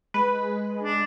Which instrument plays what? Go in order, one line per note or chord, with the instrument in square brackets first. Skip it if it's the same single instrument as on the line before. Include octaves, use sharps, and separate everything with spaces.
[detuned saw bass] G#3 [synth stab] B4
[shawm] D4